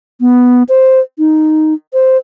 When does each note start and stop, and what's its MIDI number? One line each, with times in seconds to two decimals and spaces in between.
0.21 0.63 59
0.69 1.00 72
1.19 1.74 63
1.93 2.17 72